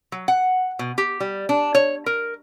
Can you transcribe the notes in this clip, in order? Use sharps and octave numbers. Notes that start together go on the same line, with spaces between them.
F#3
F#5
B2
G4
G3
D4
C#5
A#4